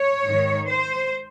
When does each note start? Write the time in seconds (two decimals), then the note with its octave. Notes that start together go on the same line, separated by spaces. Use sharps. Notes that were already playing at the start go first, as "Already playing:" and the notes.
Already playing: C#5
0.23 G#2 D#3
0.68 C5